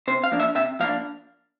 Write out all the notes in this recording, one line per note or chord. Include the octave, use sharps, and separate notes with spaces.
C3 C5
F5
F3 A#3 D4
E5
C3 E5
F3 A#3 D4 F5